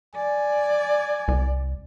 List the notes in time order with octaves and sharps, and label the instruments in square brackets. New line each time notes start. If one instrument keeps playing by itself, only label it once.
[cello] D5 [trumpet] G#5
[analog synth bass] C2